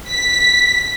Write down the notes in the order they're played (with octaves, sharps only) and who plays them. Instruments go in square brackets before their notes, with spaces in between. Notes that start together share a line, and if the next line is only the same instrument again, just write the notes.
[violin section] B6